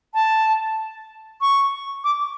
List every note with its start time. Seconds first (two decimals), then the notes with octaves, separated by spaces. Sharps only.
0.14 A5
1.41 C#6
2.04 D6